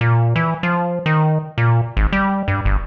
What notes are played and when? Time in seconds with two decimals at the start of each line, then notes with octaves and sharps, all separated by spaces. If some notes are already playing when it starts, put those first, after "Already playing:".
0.01 A#2
0.36 E3
0.63 F3
1.06 D#3
1.58 A#2
1.97 G#1
2.13 G3
2.48 G2
2.65 G1